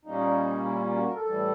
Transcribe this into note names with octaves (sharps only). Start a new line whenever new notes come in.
A#2 G3 A#3 C#4 D#4
E4
F4
F4
F#4
A#4
A4
A2 E3 G3